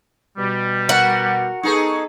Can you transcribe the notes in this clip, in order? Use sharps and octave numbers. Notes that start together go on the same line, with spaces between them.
B2 G3
F#4 A#4 F#5
B3 D#4 G#4 A4 B4 C#6